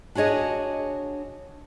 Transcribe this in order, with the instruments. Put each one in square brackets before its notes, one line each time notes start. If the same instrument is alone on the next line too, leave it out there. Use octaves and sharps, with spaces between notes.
[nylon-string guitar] D4 F#4 G#4 C#5 D#5